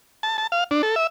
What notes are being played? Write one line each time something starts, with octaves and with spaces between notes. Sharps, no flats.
A5
A5
F5
D4
A4
E5